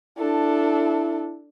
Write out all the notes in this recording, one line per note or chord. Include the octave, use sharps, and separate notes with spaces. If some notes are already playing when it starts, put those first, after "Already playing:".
D4 E4 A4